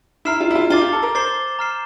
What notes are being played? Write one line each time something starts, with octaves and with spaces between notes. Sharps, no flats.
E4 A#5 F6 C7 E7
F4
E4
F4
F4 D6 A6 C7 G7
G4
A4
A#4
C5 D6 A6 C7 G7
A#5 F6 C7 E7